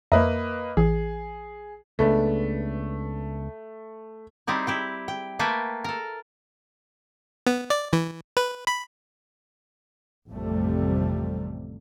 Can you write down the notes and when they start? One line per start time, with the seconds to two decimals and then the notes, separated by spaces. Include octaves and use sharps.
0.12 F2 A#3 B4 D#5 E5 A#5
0.77 A1 E3 G#4
1.99 C#2 A3 B3 D4
4.47 G3 C4 D#4 E4
4.67 E4 G4 G5
5.08 G5
5.39 A3 A#3 A4 B4 G5 G#5
5.84 A4 A#4
7.46 B3
7.70 D5
7.93 E3
8.37 B4
8.67 B5
10.29 A1 F2 C3 G3 A3